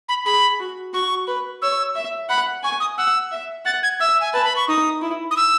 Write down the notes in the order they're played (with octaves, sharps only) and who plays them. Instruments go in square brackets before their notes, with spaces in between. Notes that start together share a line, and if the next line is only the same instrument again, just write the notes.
[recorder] B5
[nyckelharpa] G#4 [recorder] B5
[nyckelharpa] F#4
[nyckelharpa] F#4 [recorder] C#6
[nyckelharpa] B4
[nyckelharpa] C#5 [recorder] E6
[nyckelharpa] E5
[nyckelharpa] F#5 [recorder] B5
[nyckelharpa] G#5 [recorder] C#6
[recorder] D#6
[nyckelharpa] F#5 [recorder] E6
[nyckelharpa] E5
[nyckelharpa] F#5 [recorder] A6
[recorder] G#6
[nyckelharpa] E5 [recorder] E6
[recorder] G#5
[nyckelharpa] B4 [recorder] A5
[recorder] B5
C#6
[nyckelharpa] D#4 [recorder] D#6
[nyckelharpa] E4
[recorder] D#6
E6